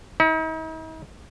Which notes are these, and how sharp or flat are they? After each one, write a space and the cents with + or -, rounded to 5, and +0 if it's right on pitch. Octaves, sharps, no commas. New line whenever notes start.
D#4 +45